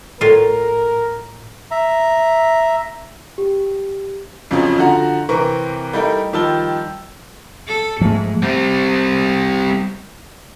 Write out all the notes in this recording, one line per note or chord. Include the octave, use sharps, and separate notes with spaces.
A2 F4 A#4
E5 A#5
G4
F2 C#3 F3 F#3 C#4
D3 F3 F#4 F#5 A#5
C3 E3 C4 A#4 B4 C#6
G3 A3 D#4 E4 A#4
D#3 F3 G3 A5 E6 G7
A4
G#2 F3 A3
G3 C4